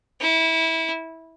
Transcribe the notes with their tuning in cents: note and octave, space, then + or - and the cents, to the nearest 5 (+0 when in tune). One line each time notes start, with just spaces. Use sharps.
E4 -20